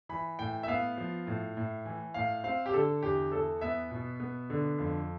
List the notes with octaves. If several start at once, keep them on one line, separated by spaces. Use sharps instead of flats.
E3 B5
A2 G5
E5
B3 F5
F3
A2
A2
E3
A2 F5
C4 F5
G4
D3 A4
E2 G4
E2 A4
B3 E5
B2
B3
D3
F2